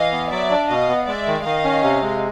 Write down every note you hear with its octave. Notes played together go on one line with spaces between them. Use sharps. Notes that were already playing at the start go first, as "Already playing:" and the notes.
Already playing: E3 D#5 F5
B3
F#3 D5 E5
D4
B2 D#5 F5
B3
G#3 D5 E5
D#3
D#3 D#5 F5
C#4
C3
G#3